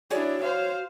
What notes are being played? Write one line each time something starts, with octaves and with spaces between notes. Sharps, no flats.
D4 E4 F#4 G#4 C#5 D5
C5 F5